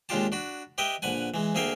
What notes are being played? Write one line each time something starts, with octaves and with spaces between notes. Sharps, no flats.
D#2 G#3 D4 F4 G4 A5
D4 F#4 B5
G4 B4 D#5 E5 G5
A#1 D3 B4 F#5 G#5
E3 G#3
D2 A#3 G#4 E5 F5 G5